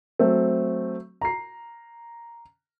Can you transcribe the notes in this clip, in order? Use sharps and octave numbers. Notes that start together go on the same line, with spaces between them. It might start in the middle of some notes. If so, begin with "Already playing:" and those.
F#3 A3 C4
A#5 C7